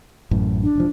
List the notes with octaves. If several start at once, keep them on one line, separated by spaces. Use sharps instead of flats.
A1 F#2 A2
D4
E1 F3